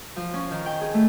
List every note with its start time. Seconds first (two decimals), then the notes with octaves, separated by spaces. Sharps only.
0.16 F3
0.34 C#4
0.51 D#3
0.66 G5
0.81 G#4
0.94 A3